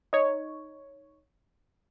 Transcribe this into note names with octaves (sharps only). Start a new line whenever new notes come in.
D#4 C#5